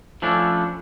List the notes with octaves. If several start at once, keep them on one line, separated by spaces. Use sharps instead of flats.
F3 A3 C#4 D4 E4